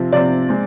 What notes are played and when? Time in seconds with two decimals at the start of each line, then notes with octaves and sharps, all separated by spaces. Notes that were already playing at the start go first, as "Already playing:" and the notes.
Already playing: C3 F3 C4
0.13 C3 F3 C4 D5
0.49 G#3 C4